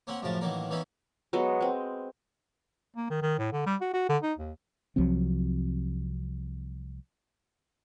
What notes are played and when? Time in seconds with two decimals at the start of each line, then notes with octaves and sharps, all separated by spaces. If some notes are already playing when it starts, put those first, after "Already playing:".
0.07 A#3 C4 C#4 A#4 F#5
0.22 F#2 A2 C#3 F3 A#4 A5
0.41 A1 D#3 E3 F#3 A#3 A#4
0.70 E3 A#3 B3 C#4 D#4 E4
1.33 F#3 G#3 B3 A4
1.61 G#3 C4
2.96 A#3
3.10 D#3
3.22 D#3
3.39 A2
3.53 D3
3.66 G3
3.81 F#4
3.94 F#4
4.09 D3
4.23 D#4
4.38 D#2
4.96 C2 F3 F#3 C4